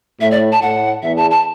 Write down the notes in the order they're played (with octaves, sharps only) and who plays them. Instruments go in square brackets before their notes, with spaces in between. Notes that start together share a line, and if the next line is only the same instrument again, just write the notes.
[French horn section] A2 [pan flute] E5
[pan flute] D5
A5
[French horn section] A2 [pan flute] F#5
[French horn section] E2 [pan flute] E5
[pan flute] A5
A5